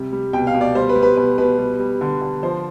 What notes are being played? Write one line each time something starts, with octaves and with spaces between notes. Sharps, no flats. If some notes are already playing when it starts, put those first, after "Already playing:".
Already playing: C3 G3
G3
B2 G5
F5
B2
D5
G3 C5
B4
G3
B4
B2 B4
B2 B4
G3
G3
D3
D3
F3 C5